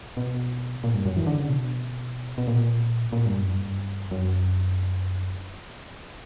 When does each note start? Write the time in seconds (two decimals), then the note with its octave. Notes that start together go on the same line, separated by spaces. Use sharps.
0.17 B2
0.84 A#2
0.94 G2
1.06 F#2
1.17 E3
1.27 D3
1.38 C#3
1.48 B2
2.38 B2
2.48 A#2
3.13 A#2
3.26 G2
3.41 F#2
3.54 G2
4.11 F#2